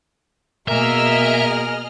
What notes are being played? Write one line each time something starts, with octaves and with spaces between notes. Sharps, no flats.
B2 A#3 G#4 A#4 D#5 E5 F6